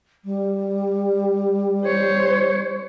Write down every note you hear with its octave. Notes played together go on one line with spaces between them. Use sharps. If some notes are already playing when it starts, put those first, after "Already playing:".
G3
C5 C#5